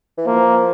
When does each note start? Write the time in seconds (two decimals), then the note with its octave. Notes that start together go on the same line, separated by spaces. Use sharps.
0.17 E3
0.27 F3 A#3